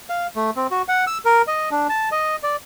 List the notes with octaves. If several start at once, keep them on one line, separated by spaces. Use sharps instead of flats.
F5
A3
C4
F#4
F#5
E6
A#4
D#5
D4
A5
D#5
D5